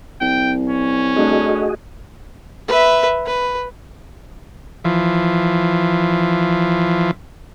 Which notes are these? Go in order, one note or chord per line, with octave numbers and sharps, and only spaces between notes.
C2 G5
C#4
A3 D4 F#4 G#4 D#5
B4 E5
B4
E3 F3